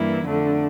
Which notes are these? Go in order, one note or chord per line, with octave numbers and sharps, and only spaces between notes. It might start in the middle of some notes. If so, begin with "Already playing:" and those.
Already playing: G2 E3 A#3 E4
F2 D3 A3 D4